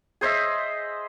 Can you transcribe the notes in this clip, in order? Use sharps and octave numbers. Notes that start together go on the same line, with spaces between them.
G#4 C5 D#5 E5